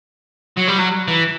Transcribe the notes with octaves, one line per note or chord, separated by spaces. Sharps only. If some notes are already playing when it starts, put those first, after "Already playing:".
F#3
G3
F#3
E3